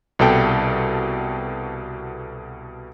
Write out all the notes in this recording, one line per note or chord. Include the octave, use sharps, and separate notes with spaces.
C2 B2 A4 G5